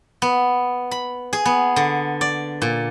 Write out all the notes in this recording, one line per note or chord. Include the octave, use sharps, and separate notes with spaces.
B3
B5
G#4
B3
D3
D5
A#2